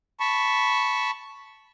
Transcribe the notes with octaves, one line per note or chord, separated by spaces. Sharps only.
A5 B5 C#6